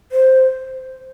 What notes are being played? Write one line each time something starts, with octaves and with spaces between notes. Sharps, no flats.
C5